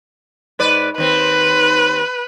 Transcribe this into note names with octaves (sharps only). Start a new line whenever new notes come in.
G#2 B4 D5
D#2 C4 B4